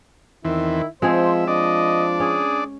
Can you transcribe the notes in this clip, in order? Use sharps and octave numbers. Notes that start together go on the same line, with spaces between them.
E2 D#3 E3 C4 E4
F3 G#3 C4 G#4 C5 E5
F3 D4 D5 D#5
C#4 G#4